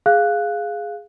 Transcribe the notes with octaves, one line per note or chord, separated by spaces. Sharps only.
G#4 F5 F#6